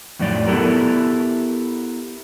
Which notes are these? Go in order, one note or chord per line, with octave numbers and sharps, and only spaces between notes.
F2 A2 F#3 D#4 D5
B3 E4 G4 A4 A#4